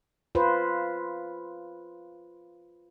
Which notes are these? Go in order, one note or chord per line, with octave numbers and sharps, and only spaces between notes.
F4 B4 C5